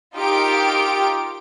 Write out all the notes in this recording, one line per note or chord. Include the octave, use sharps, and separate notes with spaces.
D#4 F4 G4 A#4 G5 D7